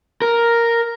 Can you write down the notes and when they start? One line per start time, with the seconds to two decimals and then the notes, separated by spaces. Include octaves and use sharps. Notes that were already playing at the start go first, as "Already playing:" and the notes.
0.22 A#4